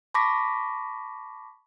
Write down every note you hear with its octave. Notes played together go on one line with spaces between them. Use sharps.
A5 B5 C#6 D6 A#6 B6